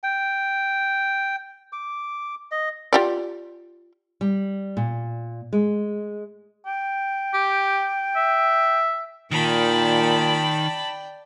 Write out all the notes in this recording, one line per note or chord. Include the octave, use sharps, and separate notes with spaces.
G5
D6
D#5
F4 G4 D5
G3
A#2
G#3
G5
G4
E5
A#2 D#3 D5 G5 A5 B5